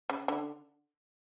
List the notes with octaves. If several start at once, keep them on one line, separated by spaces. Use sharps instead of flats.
C#3
D3